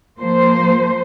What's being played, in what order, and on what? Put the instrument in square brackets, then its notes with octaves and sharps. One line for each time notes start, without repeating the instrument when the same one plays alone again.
[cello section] F3 A#3 C5